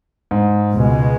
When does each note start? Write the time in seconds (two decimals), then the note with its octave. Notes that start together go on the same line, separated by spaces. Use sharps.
0.31 G#2
0.71 C#2 B2 G#3